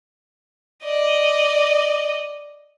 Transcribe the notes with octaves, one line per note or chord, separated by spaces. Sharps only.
D5 D#5